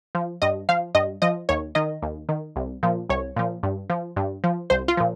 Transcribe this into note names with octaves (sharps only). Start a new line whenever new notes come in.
F3
G2 D#5
F3 F5
G2 D#5
F3 D#5
D#2 C#5
D#3 D#5
D#2
D#3
C2
A#2 F3
C2 C#5
A#2 F3
G2
F3
G2
F3
C2 C5
F4
A#2 F3